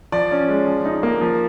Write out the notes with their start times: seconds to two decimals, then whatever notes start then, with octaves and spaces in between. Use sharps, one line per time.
0.12 F3 D5
0.31 C#4
0.48 G#3
0.67 F3
0.85 D#4
1.03 A#3
1.21 F3